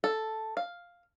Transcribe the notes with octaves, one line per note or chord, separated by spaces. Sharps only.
A4
F5